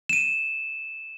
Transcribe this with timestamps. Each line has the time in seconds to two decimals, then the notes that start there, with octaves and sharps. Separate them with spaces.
0.09 D#7 E7